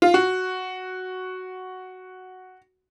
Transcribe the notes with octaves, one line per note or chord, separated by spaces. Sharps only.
F4
F#4